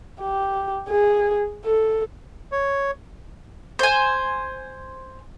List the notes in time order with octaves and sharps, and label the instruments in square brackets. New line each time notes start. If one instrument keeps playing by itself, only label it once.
[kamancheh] G4
G#4
A4
[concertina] C#5
[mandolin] C5 G#5